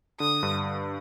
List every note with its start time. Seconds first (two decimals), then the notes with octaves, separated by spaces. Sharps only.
0.20 D3 D#6
0.43 G2